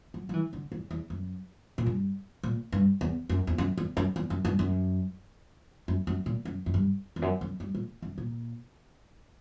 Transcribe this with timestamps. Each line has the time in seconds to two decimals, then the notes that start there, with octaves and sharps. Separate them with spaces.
0.14 F#3
0.29 F#3
0.34 E3
0.53 D3
0.72 E2
0.91 E2
1.10 F#2
1.78 A#2
1.86 G2
2.43 A#2
2.72 G2
3.01 E2
3.29 F#2
3.47 E2
3.58 F#2
3.78 E2
3.97 F#2
4.16 E2
4.30 F#2
4.45 G2
4.59 F#2
5.88 F#2
6.07 F#2
6.26 A#2
6.45 F#2
6.66 F#2
6.74 G2
7.16 E2
7.22 F#2
7.41 F#2
7.60 G2
7.75 A#2
8.02 F#2
8.18 A#2